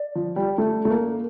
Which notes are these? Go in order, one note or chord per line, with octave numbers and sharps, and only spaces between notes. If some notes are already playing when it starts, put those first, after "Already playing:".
Already playing: D5
F3
G3
A3
A3
A#3